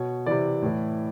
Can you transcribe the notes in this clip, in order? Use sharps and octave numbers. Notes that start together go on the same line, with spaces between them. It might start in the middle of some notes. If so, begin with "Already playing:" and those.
Already playing: B2 C#5
C3 E3 D5
A2 E3